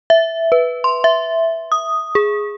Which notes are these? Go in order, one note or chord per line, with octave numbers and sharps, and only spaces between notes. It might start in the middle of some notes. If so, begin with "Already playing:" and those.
E5
B4
C6
E5
D#6
G#4